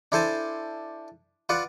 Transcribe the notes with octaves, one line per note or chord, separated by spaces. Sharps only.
D4 E4 A4 C5 G#5 A5
F4 B4 D5 F#5